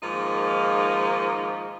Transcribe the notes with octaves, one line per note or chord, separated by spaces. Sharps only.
G#2 D#3 F3 A#3 D#4